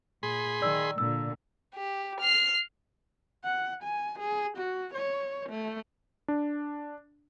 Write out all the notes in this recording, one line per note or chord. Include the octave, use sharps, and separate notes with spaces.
A#2 G#4 B5 C6
D#3 D5 E6
A#2 D3 E6
G4
F6 C7
F#5
G#5
G#4
F#4
C#5
A3
D4